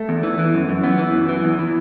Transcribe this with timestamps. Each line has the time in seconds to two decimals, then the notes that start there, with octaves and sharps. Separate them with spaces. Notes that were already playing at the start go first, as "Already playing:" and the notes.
Already playing: A3
0.09 E2
0.23 E3
0.39 E3
0.54 F#2
0.69 F#2
0.84 E3 B3
0.98 E3
1.14 F#2
1.29 E3
1.44 E2
1.59 E3